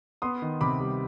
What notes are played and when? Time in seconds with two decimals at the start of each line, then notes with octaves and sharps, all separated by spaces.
0.22 B3 C6 D#6
0.42 D#3
0.61 C3 B5 D6
0.81 G3